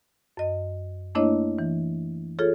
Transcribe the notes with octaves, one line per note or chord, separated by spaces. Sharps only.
F#2 D#5
A3 A#3 D4 E4 C#5 D#5
E3
F4 G#4 A4 C#5